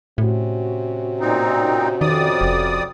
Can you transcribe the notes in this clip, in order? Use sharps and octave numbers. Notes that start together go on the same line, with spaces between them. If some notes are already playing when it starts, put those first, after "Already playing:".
A2 C3 C#4 F#4
A#2 C4 D#4
F2 D#3 D5 D#6
F1